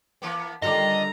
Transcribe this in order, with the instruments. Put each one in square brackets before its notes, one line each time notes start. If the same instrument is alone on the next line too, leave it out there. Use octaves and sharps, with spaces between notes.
[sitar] E3 A#3 B3
[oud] D3 D#3 G3 [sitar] F4 A4 D5 [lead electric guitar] D#5 [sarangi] A#5